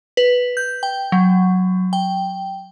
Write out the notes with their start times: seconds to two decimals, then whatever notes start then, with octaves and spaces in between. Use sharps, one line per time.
0.17 B4
0.57 G6
0.83 G5
1.12 F#3
1.93 G5